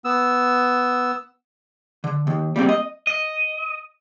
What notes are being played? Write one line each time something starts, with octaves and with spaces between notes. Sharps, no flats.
B3 E6
D3
D#2
G3 A#3 C4
D#5
D#5